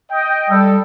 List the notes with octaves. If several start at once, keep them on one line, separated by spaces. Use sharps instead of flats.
D#5 G5
G3 A4